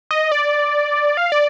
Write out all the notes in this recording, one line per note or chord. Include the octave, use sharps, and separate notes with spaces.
D#5
D5
F5
D5